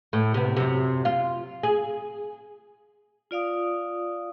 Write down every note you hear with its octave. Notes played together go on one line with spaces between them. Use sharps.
A2
C3 B3
F#2 C3
F4
G#4
F4 D5 F5 D#6